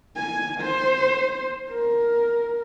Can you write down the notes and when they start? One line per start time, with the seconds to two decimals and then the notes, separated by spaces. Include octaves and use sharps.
0.16 G#5
0.61 C5
1.70 A#4